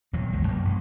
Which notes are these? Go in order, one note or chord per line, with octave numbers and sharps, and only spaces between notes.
D#1 E2 F#3
F#1 C#2 G#3
E1 F#2 F#3 A#3
A1